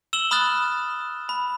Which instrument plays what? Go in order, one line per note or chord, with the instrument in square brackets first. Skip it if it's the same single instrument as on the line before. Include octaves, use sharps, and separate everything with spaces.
[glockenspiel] E6 E7 F#7 G7
B5 D#6 F6 F#6 A6
B5